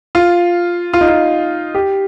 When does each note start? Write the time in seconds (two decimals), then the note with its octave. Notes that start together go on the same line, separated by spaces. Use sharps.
0.15 F4
0.93 F4
1.01 D#4
1.08 F4
1.75 G4